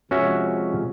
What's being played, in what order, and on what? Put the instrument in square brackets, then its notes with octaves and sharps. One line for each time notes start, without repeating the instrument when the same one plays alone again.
[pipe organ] C3 F3 G#3 [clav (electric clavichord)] C#4 F#4 E5